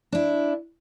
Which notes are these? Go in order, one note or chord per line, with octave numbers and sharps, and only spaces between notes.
D4 E4